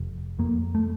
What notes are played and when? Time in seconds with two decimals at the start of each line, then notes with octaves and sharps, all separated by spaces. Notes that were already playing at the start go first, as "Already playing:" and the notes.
Already playing: F1
0.39 F2 A#3
0.75 A3